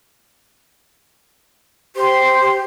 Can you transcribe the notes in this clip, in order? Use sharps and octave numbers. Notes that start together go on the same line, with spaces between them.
G4 C5 C6